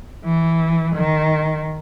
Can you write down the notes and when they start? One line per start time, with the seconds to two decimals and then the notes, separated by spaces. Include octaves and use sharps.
0.25 E3
0.95 D#3